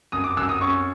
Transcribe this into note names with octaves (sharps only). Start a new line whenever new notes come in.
F#2 D#6
D6
F#2 E6
D#6
C#4 C#6